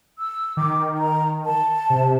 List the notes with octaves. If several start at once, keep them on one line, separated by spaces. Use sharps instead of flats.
E6
D#3 D6
A#5
A5
C3